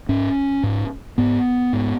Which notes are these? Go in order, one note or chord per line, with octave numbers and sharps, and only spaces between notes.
G#2 C#4
G#2
G#2 B3
G#2